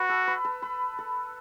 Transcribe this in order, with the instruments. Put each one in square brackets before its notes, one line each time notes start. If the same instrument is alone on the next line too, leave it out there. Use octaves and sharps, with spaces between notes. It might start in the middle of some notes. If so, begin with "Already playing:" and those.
Already playing: [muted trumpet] F#4 [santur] B4
[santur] A4
B4
A4
B4
A4